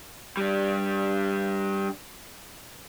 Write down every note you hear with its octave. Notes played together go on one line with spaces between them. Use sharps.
G3 D4